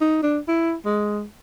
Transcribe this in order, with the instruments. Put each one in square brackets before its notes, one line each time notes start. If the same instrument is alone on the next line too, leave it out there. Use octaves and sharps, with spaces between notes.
[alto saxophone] D#4
D4
E4
G#3